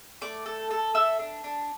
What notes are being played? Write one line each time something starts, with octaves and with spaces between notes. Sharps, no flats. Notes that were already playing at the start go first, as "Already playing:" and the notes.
A3 D5 D6
A4
A4
A4 E5 E6
D4
D4